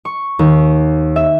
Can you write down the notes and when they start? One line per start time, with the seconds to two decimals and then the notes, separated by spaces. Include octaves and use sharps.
0.05 C#6
0.39 D#2
1.16 E5